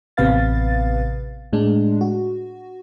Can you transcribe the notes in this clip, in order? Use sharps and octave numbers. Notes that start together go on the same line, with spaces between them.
A1 C3 B3 B4 F5 A6
A2 G#3 D4
F#4